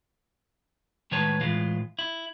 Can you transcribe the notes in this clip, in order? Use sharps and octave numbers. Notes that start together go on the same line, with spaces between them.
A2 D#3 G#3 B4 C#5 A5
A2 E3 G#3 F4
E4